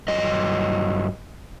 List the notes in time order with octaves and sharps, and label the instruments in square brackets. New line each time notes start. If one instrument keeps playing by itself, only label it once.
[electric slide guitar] G2 F#3 D#5